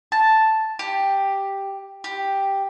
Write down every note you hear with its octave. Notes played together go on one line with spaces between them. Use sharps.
A5
G4
G4